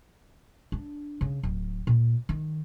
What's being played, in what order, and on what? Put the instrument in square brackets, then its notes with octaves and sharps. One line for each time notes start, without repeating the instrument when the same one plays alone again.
[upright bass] D4
C#3
D1
A#2
D#3